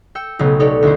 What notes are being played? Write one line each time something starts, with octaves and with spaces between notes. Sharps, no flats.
G5 E6 C#7
B1 C#3 A3 B3
D#4 G4 A4 C#5 D5
D2 E4 C5